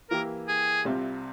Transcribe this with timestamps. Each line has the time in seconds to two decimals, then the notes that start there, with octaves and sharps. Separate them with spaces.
0.10 E3 A#3 E4 G4 A#4
0.48 G#4
0.85 C2 C3 G3 C4 F4